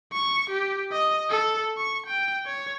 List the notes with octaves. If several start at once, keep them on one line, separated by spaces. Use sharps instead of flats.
C#6
G4
D#5
A4
C#6
G5
C#5